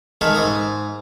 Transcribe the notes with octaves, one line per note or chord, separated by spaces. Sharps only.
D#3 G#3 A4 E5 F5 D#6
G#2 D#5 A#5